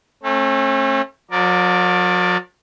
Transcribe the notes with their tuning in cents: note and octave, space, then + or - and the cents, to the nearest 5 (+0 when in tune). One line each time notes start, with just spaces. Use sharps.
A3 +0 C#4 -45
F#3 -45 A#4 +0 D5 +0